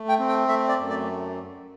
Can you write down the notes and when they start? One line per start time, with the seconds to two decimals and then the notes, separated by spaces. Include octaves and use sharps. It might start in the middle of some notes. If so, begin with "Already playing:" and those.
Already playing: A3
0.09 G5
0.19 C4
0.29 G5
0.48 A3 E5
0.68 D5
0.79 F#2
0.89 D5